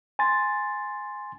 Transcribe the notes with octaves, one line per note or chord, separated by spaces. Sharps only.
G#5 C6 A6